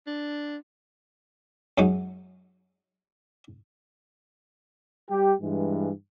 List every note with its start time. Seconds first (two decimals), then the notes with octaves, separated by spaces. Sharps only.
0.07 D4
1.78 F#2 F#3 G#3 D#4 F#4
5.09 G3 G4
5.42 G2 E3 G#3